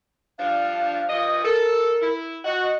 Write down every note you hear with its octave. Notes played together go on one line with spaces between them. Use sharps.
F3 G3 D4 F5
G2 F3 D#5
A4 A#4
E4
F#4 D#5